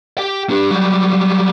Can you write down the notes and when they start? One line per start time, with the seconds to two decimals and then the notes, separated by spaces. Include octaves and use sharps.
0.18 G4 G5
0.50 D4 G4
0.71 F#3 G3